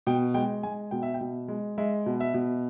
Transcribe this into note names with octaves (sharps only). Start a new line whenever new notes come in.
B2 G5
G#3 G5
G#3 G#5
B2 G5
E5
G5
B2
G#3
G#3 E5
B2
E5
B2